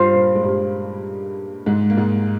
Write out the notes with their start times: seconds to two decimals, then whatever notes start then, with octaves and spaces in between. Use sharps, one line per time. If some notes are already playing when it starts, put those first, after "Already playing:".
Already playing: G2 G3 F4 C5 F5
0.13 A#2 A#3
0.36 G#3
0.44 G2 G3
1.66 G#2 G#3
1.90 A#3
1.97 G#2 G#3